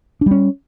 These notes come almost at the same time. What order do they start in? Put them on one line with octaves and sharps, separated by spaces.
D4 G3 C#4